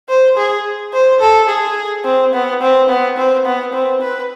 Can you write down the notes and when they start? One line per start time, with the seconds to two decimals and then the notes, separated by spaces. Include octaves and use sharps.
0.09 C5
0.37 G#4
0.93 C5
1.20 A4
1.49 G#4
2.05 C4
2.33 B3
2.62 C4
2.89 B3
3.17 C4
3.45 B3
3.73 C4
4.02 B4